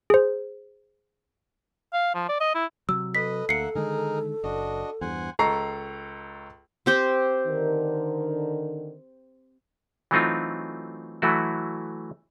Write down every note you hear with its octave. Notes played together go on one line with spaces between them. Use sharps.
G#4 C5
F5
F3
D5
D#5
E4
C3 F#3 E6
A4 B4 D#5 B6
D2 A#3 E5 F#5 C7 C#7
D3 D#3 G#3 D#4 G#4 A#4
F#1 D4 F#4 D#5
E2 G2 C5 F#5 G#5
C#2 A4 A#5 C#6 C7
C4 G4 C5
D3 D#3 A#4
E3 F#3 A3 C4 D#4 F4
E3 F#3 A3 E4 F#4